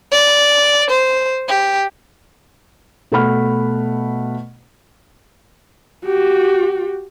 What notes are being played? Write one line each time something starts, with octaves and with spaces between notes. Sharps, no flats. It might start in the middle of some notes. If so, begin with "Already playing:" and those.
D5
C5
G4
B2 A3 F#5 B5 F6
F#4 G4